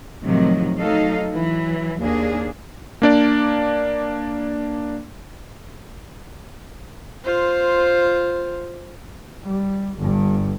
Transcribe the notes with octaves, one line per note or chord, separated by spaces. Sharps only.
A2 C3 D#3 F3 F#3
F#3 A3 D#4 A4 F5
E3 F#3
D#2 A#3 D4 G#4
A#3 D4 D5
F4 C5
G3
G1 G2